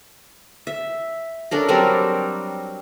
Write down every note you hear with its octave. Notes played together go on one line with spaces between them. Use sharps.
E5
C#4 D4 A4 A#4
F#3 G3 C4 A#4